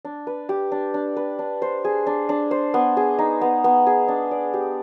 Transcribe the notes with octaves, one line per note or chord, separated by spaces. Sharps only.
D4
B4
G4
D4
D4
B4
D4
C5
G#4
D4
D4
C5
B3
G#4
D#4
B3
B3
G#4
D4
D5
G4